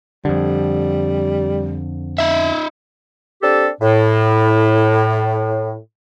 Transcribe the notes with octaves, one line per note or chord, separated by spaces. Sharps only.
F2 D3 G3
D#4 E5
C4 D4 G4 A4
A2